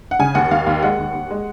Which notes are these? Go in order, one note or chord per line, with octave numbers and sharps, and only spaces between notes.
F#5
C#3 G#5
D#2 F#5
D#2 F5
D#2 F5
G#3 F#5
D#2
D#2
G#3